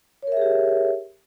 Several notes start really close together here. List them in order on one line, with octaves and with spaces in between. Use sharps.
C#5 A#4 E5 G#4 G4